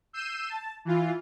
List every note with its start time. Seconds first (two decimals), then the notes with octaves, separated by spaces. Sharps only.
0.13 E6 G6 C7 D#7 E7
0.50 A5
0.85 E3 F4